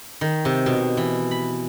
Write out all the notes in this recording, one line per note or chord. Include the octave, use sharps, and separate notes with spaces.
D#3
C3
B2
E3
B5